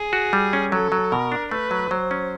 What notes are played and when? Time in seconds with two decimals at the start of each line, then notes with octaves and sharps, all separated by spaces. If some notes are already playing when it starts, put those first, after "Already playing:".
Already playing: G#4
0.13 F#4
0.33 G3
0.53 C#4
0.72 F#3 A4
0.92 F#3
1.12 B2 A#4
1.32 D4
1.51 A3 B4
1.71 F#3
1.90 F#3 C5
2.11 C#4